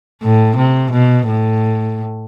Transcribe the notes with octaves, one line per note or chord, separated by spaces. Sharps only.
A2
C3
B2
A2